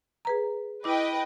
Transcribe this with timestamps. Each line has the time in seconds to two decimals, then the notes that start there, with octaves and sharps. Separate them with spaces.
0.25 G#4 B4 A#5
0.84 E4 B4 D#5 G5 D6